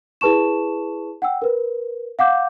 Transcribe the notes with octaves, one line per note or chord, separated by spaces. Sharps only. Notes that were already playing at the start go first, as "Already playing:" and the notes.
E4 G#4 B4 A5 C#6 E7
F#5 G5 E6
A#4 B4
F5 F#5 D6 G6